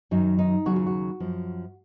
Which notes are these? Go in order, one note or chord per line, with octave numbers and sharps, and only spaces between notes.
F#2 D#3 F#3 D#4
D#4
D#2 C#3 F#3 F#4
F4
F#4
F#2 F3